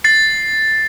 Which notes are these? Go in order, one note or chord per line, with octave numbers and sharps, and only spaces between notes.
A6 C7